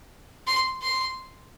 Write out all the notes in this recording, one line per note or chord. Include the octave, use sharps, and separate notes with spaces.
C6
C6